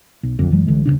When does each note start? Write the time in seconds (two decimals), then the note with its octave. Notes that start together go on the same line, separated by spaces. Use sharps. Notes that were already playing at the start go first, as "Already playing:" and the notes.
0.23 B1
0.39 F1 B1 F2 D3
0.52 F#2 E3 F#3 G#3
0.67 C2 D3 E3 G#3
0.85 D#1 E2 C#3 D4